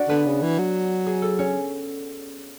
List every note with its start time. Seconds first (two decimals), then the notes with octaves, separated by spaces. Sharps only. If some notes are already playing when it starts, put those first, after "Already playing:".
Already playing: D4 F#4 D5 F#5
0.09 D3 B3 B4
0.26 C#3
0.42 E3
0.58 F#3
1.06 G#4
1.22 A4
1.39 C#4 C#5